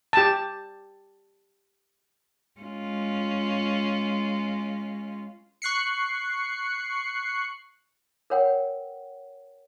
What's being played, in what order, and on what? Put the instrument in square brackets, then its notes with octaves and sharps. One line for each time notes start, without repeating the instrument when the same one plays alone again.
[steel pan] G4 A5
[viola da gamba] G#3 C#4 F4
[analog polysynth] C#6 F#6 C7 C#7
[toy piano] A#4 B4 C#5 F#5 G5